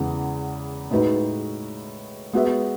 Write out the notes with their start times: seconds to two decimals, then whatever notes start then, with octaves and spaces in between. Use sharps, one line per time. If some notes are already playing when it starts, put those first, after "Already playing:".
Already playing: E2 C#3 E3 G#3 B3
0.91 A2 G#3 D#4 F#4 B4
2.33 G#3 B3 F#4 B4 E5